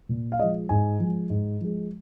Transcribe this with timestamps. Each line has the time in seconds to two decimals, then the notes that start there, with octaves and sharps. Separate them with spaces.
0.09 A#2
0.32 F5
0.39 F3 G#3 D#5
0.69 G#2 G#5
1.00 F3 G#3
1.30 G#2
1.61 F3 G#3